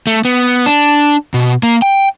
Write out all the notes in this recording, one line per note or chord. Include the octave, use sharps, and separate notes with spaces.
A3
B3
D4
B2
A#3
G5